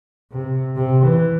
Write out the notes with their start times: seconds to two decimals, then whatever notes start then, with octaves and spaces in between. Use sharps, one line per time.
0.32 C3
0.76 C3
1.05 E3